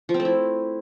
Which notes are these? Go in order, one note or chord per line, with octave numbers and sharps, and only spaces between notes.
F3
C4
A3
E4